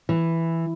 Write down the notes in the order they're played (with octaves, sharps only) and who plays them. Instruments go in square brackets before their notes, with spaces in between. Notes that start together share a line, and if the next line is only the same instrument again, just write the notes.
[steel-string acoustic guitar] E3